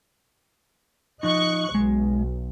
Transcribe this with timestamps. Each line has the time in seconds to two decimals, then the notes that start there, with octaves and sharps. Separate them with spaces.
1.23 F3 D#4 D#5 C#6 F#6
1.75 B1 G#3